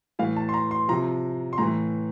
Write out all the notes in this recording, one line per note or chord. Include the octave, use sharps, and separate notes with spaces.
A2 E3 F5
A5
C6
A#5
C6
C3 F3 A#5
C6
A2 E3 A#5